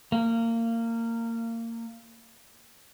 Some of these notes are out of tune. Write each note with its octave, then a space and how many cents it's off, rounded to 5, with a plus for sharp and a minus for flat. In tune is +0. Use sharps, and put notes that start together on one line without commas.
A#3 -25